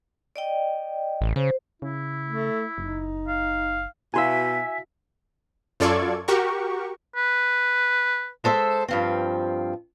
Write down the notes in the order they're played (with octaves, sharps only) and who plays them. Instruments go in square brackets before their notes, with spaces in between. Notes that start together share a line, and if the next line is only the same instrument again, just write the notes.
[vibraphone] D5 D#5 G5
[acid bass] A1
[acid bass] C#3 [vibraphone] C5
[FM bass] C#3 [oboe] E4
[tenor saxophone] A3
[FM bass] F#1 [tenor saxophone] D#4
[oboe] F5
[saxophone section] B2 [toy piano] E4 F#4 F5 [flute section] E5 [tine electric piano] G#5 E6
[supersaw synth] F#2 F4 A4 D5 C#6 G#6
F#4 G4 A#4 C#6
[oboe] B4
[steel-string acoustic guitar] G#3 A4 C5 D#5 E5
G2 F3 C4